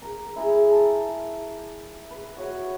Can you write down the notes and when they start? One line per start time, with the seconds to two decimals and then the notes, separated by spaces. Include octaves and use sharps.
0.02 A#4
0.36 E4 G#4 A#4
0.71 A5
2.11 B4
2.37 F#4 C#5 F#5